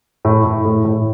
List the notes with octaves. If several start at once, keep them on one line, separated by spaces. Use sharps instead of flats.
A2
A2
A2
A2